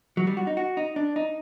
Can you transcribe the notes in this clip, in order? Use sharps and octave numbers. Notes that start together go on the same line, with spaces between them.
F#3
G3
F#4
D#4
F#4
D#4
D4
D#4